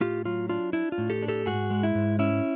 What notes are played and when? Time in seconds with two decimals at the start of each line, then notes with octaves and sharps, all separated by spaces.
0.01 A2 F4 G4
0.25 F#3 F4
0.49 D4 F4
0.73 D4 E4
0.92 F4
0.98 A2
1.10 G4 A4
1.22 D4
1.28 G4 A4
1.46 G#2 F#4 G#4
1.71 G#3
1.83 E4
1.95 G#2
2.19 C#4 E4